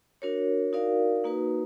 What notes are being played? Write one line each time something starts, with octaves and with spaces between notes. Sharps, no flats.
D4 F#4 A#4 C#5
D#4 F#4 A#4 D5 F5
A#3 D#4 F#4 B4